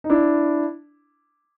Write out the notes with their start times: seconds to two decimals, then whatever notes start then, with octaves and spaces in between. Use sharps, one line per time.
0.04 D#4
0.10 D4 E4